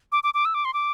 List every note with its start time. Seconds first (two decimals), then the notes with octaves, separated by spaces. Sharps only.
0.12 D6
0.24 D6
0.34 D6
0.45 E6
0.54 D6
0.65 C6
0.74 D6